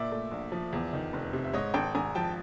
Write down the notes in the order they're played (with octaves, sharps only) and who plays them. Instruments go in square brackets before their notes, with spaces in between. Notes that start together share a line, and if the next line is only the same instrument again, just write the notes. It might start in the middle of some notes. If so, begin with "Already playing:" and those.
Already playing: [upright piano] A#2 A#3 [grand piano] D5 E5
[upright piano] A3
A#1
F3
E2
D#3
F1
C3
[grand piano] E5
[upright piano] G#2 [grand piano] C#5 D#5
[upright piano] G#1 [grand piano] G5 A5
[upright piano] G#1 [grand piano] G#5 A#5
[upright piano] F3 [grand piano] G5 A5